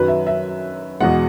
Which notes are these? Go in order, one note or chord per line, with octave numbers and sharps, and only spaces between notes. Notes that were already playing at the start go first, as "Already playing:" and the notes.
Already playing: F#2 D#3 F#3 B4
E5
E5
E2 B2 G#3 F#5